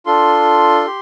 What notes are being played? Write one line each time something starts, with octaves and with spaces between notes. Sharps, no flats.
D4 F4 A4 C6
G4